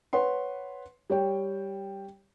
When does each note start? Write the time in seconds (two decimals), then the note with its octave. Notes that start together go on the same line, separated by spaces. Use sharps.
0.13 B4 C#5 F#5 C6
1.10 G3 C#5 G5